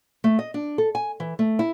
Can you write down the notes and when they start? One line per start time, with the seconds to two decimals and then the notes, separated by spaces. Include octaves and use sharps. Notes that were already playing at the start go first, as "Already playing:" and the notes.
0.24 A3
0.39 D#5
0.54 D4
0.78 A4
0.95 G#5
1.20 E3
1.39 A3
1.59 E4